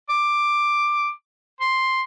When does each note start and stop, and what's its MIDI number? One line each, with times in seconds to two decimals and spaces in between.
0.09 1.10 86
1.61 2.02 84